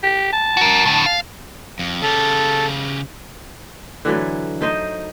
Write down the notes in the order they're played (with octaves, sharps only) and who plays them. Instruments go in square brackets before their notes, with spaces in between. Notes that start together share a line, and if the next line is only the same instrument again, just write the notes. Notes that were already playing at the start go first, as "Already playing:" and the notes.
[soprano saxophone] G4
A5
[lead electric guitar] F#4 A#4
A2 D3
F5
[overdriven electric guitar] F2
[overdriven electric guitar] C#3 G4 [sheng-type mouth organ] A4
[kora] D3 E3 F#3 A3
A3 D#4 C5 D#5